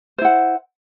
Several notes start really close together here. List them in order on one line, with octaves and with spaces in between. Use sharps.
C5 E4 F#5